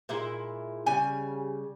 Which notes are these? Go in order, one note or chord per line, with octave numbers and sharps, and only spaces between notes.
A#2 G#3 E4 E5
C#3 G3 G#5